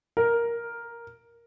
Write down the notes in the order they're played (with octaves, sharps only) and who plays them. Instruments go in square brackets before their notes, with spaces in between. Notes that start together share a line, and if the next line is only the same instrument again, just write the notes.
[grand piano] A#4